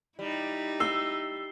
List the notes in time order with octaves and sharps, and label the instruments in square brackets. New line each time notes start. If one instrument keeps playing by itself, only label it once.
[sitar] G3 [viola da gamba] D#4 E4
[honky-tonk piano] E6 [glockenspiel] C7 G7